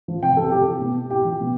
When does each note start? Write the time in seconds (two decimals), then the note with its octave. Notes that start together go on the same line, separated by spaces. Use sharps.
0.08 F3
0.23 C3 G5
0.37 F3 A4
0.51 C3 G4
0.66 E3
0.81 B2
1.10 A2 G4
1.25 F3
1.41 B2